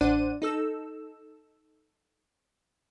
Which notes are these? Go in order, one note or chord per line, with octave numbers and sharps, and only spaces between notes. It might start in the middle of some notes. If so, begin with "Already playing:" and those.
A1 D4 C5 D5 F#5 D#7
D#4 A4 E6